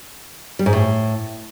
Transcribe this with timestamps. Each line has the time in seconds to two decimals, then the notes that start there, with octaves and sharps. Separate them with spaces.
0.59 G3
0.66 G#2
0.73 A2